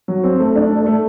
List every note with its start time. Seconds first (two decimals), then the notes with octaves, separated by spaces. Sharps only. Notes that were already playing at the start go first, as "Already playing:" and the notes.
0.08 F#3
0.24 C4
0.40 A3
0.56 D4
0.71 A3
0.86 A3